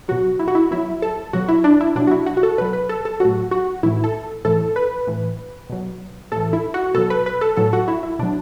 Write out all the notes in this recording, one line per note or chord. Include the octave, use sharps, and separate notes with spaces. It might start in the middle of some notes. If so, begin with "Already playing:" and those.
B2 F#3 F#4
E4
F#4
E4
B2 F#3 E4
A4
B2 F#3 F#4
E4
D4
E4
B2 F#3 D4
F#4
E4
F#4
F#4
A4
B2 F#3 B4
B4
A4
A4
A2 F#3 F#4
F#4
A2 E3 E4
A4
A2 E3 A4
B4
A2 E3
B2 F#3
A2 E3 A4
E4
F#4
B2 F#3 A4
B4
B4
A4
A2 F#3 A4
F#4
E4
E4
B2 F#3 D4